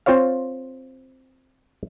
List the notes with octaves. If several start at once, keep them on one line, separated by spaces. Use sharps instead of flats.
C4 F4 C5 C#5 F5